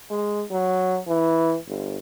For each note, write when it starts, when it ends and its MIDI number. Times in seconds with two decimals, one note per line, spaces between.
0.10 0.44 56
0.51 0.99 54
1.08 1.56 52
1.67 1.97 31